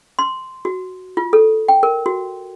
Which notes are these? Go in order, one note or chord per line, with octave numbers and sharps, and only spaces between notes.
C6
F#4
F4
A4
G5
A#4
F#4